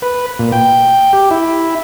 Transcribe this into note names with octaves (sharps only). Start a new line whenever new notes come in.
B4
A#2
G5
G4
E4